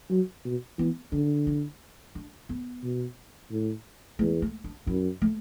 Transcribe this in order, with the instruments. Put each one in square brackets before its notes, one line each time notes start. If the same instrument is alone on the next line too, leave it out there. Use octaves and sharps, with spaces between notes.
[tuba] F#3
B2
[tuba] E3 [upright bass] B3
[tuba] D3 [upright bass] D4
[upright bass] E4
D4
B3
[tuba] B2
A2
[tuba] E2 [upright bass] A3
[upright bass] A3
D4
[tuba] F#2 [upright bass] E4
[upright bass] A3